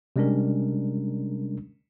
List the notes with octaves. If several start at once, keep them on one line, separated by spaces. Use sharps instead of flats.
C3 G3 G#3 C#4 D4 A#4